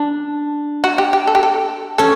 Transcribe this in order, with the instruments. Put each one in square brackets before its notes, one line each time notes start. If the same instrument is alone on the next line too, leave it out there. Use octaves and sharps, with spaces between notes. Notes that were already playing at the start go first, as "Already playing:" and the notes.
Already playing: [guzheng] D4
[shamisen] F#4
G4
G4
A4
G4
A4
[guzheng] C#4 [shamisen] A4